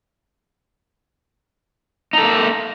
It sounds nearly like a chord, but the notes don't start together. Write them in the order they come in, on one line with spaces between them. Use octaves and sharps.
D#4 A4 A#3